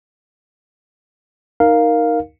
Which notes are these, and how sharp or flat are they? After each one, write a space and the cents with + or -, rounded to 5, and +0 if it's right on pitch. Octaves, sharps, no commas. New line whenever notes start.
D#4 +0 A#4 +0 F5 +0